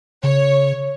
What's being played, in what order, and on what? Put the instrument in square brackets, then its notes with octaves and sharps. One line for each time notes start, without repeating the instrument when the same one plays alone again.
[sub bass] C#3 [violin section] C#5